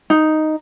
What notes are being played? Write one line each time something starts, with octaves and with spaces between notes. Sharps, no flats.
D#4